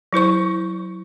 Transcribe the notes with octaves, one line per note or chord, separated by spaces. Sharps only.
F#3 E4 C5 C#6